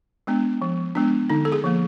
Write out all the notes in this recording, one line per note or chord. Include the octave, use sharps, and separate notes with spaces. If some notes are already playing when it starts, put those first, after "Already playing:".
G#3 B3 D4
F3
G#3 B3 D4
D3 D#4
A4
G#4
F3 A#3